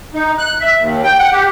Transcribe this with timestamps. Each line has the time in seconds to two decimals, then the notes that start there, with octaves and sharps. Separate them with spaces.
0.14 D#4
0.38 F#6
0.61 E5
0.78 D#2
1.03 G5
1.19 F#5
1.32 G4